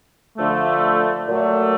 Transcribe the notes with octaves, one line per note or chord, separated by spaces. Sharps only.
D3 F3 A3
A#2 F#3 A3